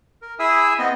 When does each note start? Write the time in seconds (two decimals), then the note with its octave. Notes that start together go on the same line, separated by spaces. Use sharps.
0.22 A#4
0.39 E4 G#4 E5 G#5 D#6 E6
0.79 B3 C4 D#5